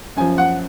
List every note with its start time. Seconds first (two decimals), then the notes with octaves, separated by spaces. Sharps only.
0.16 F#2 F3 G#5
0.38 F#5